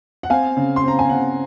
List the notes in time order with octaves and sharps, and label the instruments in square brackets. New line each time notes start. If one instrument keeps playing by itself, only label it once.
[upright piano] F#5
C4 F5 G#5
C#3
C6
C4 A#5
G#5
C#3 F#5